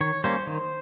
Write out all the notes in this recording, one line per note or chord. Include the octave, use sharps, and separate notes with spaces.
D#3 C#5
G3 A#3 C#4 C5
D#3